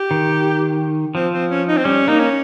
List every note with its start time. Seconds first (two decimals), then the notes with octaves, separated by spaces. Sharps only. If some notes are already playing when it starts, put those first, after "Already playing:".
Already playing: G4
0.11 D#3
1.15 F3 C4
1.33 C4
1.50 C#4
1.68 D#4
1.77 C4
1.85 G3 C#4
2.08 A#3 D#4
2.19 C#4